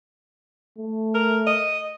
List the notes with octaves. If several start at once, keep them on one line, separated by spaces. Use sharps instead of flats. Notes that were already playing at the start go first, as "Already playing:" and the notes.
A3
A#4
D#5